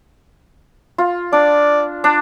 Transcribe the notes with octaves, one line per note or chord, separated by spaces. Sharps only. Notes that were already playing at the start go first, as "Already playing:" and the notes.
F4
D4 D5
D4